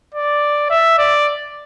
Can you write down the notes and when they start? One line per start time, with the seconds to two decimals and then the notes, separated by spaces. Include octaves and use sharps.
0.14 D5
0.70 E5
0.98 D5